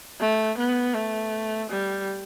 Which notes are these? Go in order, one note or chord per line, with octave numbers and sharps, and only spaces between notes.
A3
B3
A3
G3